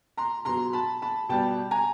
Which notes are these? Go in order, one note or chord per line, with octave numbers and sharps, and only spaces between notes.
A#5 C6
B2 F#3 A#5 C6
A5 B5
A5 B5
B2 G3 G5 A5
G#5 A#5